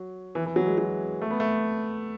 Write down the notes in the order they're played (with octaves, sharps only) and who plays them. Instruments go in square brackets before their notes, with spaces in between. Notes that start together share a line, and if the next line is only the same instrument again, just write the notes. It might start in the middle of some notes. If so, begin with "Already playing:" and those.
Already playing: [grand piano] F#3
E3
E3
F#3
G#3
F#3
A3
B3
A3